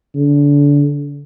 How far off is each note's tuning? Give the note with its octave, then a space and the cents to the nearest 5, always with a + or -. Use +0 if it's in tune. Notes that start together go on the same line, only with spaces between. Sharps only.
D3 -30